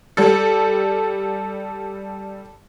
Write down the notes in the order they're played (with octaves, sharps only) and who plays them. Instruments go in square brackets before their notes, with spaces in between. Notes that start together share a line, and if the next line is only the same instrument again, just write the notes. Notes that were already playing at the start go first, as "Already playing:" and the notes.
[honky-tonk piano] G3 A4